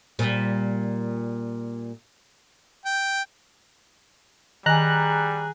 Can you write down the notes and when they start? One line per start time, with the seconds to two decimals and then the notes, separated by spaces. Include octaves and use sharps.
0.19 A#2 G3
2.86 G5
4.66 D#3 G3 G#4 G#5 A#5 F#6